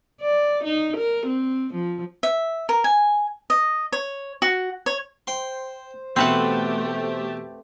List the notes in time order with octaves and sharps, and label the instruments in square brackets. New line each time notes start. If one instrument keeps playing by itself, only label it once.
[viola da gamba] D5
D#4
A#4
C4
F3
[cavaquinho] E5
A#4
G#5
D#5
C#5
F#4
C#5
[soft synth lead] C5 [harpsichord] G5 C6
[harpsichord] E2 B2 C6 [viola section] A3 G4 [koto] C4 B4 F#5